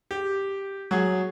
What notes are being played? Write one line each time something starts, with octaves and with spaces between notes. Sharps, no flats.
G4
F#3 G#4